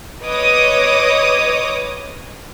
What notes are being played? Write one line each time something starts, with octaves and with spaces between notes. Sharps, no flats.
B4 C#5 D#5 D6 D#6